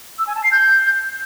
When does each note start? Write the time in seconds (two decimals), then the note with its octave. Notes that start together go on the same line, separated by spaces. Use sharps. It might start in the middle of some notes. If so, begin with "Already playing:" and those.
0.19 E6
0.27 G#5
0.35 A5
0.44 C7
0.52 G6